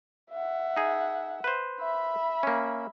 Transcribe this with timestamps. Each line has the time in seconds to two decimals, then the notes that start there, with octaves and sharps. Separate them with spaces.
0.31 E5 F#5
0.76 D#4 G#4
1.44 B4 C5
1.80 E5 B5
2.43 A#3 C#4